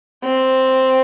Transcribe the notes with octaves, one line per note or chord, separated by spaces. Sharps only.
C4